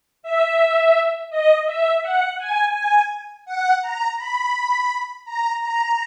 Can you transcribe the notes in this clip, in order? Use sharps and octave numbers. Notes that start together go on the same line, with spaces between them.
E5
D#5
E5
F#5
G#5
G#5
F#5
A#5
B5
A#5
A#5